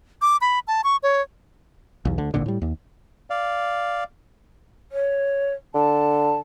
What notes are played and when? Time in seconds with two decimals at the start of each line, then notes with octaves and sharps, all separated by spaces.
0.22 D6
0.41 B5
0.68 A5
0.84 C#6
1.03 C#5
2.05 B1 E2
2.18 D2 D3
2.34 D1 G#1 A#2 D3
2.46 A2 G3
2.62 D#2
3.30 D5 F5
4.92 C#5
5.74 D3 A5